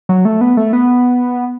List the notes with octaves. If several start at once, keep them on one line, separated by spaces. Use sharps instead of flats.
F#3
A3
B3
A3
B3